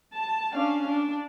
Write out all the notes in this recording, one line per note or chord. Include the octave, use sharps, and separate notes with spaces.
A5
C#4 D4 F5
D4